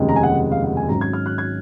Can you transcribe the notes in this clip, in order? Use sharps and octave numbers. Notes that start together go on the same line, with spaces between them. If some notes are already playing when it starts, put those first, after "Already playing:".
Already playing: F1 D#2 C#3 G#3
A#5
G#5
F#5
F5
F#5
G#5
G#1 G#2 F#3 C#4 A#5
G#6
F6
F#6
G#6